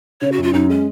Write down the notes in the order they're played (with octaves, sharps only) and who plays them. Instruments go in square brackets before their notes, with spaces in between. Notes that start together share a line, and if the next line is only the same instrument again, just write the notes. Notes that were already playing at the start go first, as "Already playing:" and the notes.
[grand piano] C#3 [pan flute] C#5
[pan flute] F#4
[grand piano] F#2 [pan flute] F4
[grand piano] F#2 [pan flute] D#4
[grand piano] G#3 [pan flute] C#4